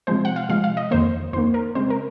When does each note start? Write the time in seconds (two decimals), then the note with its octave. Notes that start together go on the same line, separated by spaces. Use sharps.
0.07 C3 F3 G#3 C5
0.25 F#5
0.36 F5
0.49 C3 F3 G#3 F5
0.64 F5
0.77 D#5
0.91 F2 D#3 A#3 C5
1.33 F2 C5
1.36 D#3 A#3
1.54 A#4
1.75 C#3 G#3 C4 C5
1.90 A#4